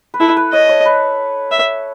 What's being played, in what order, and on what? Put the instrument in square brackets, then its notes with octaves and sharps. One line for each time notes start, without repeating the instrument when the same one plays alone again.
[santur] B4
[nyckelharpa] E4 [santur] A4
[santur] B4
[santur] C#5 [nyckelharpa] D#5
[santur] C#5
B4
[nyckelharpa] E5